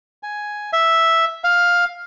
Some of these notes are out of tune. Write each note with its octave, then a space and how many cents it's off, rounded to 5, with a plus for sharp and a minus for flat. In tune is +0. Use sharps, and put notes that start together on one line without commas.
G#5 +5
E5 +0
F5 +10